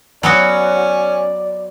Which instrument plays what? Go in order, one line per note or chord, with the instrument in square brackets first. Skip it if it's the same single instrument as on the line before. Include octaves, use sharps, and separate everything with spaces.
[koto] F#3 B3 F#4 [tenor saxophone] C#4 [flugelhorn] D5